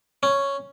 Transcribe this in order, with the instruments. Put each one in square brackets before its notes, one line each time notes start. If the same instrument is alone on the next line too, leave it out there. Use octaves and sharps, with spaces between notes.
[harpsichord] C#4